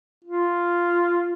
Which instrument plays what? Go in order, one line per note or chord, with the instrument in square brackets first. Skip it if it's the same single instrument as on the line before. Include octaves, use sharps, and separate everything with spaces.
[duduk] F4